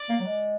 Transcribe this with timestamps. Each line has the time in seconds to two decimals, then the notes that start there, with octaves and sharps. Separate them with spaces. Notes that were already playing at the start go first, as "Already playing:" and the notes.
Already playing: D5
0.09 A#3
0.20 F#3
0.26 G#3